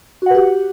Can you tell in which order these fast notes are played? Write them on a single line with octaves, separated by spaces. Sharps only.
F#4 F#5 B4 G4